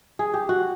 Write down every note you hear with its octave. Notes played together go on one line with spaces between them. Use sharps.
G#4
G4
F#4